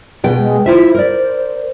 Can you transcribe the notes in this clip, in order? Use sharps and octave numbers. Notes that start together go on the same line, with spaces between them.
B2 G#4 G5
G#3
E4 F4 C5 E5
A#4 D5